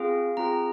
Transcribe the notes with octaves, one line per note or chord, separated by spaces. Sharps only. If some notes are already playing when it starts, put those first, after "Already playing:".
Already playing: C4 F4 G#4 F5
C4 F4 G#4 A#5